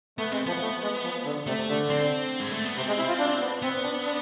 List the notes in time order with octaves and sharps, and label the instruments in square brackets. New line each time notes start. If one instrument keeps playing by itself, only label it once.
[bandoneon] A3 [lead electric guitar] B3
[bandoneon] G#3 [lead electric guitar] C4
[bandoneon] F3 [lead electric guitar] B3
[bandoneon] A3
G#3
F3
D3
[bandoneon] C3 [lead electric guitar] A3
[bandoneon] D3
[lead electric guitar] C4
G#3
A3
B3
[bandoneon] C3 [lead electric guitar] C4
[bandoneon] G#3
E4
F4
D4
B3
[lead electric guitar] B3 [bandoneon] C4
[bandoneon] D4
D4